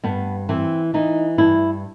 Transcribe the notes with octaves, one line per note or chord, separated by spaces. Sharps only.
G2 B3
E3 C4
E3 D#4
G2 E4